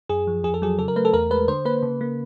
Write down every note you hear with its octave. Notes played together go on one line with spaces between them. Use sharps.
F#2 G#4
F3
F2 G#4
A4
F#3 G#4
C#3 A4
A#4
A3 B4
A4
E2 A#4
G#3 B4
D3 C5
A#3 B4
C#3
A#3